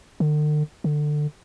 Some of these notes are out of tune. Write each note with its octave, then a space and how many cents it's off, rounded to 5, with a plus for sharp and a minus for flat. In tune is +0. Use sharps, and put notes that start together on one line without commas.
D3 +45
D3 +20